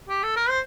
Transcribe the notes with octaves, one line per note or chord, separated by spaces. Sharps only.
G4
A4
A#4
C5